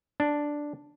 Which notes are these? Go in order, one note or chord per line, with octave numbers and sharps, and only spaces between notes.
D4